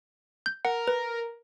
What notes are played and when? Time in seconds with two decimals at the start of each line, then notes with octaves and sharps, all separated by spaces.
0.46 G6
0.65 A#4 F#5
0.88 B4